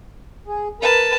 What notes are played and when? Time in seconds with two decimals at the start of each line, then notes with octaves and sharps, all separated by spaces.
0.47 G#4
0.81 A#4 B4 A5